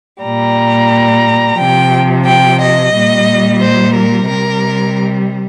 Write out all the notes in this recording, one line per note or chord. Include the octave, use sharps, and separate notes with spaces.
A#2 G3 A#5
C3 F3 G5
G5
D#5
A#2 G3
C5
A#4
C3 G3 A#4